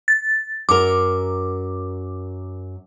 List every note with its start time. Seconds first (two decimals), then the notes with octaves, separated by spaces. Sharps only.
0.08 A6
0.69 F#2 A#4 D6